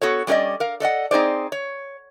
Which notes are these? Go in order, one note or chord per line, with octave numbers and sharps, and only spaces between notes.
B3 F#4 A4 C#5
G3 C#4 D#4 G#4 D5 D#5
A#4 F5
A4 D5 D#5 F#5
C4 D#4 G#4 C5 D5
C#5